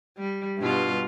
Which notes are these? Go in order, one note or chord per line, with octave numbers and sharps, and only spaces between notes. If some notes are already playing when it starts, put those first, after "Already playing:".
G3
G2 B2 F4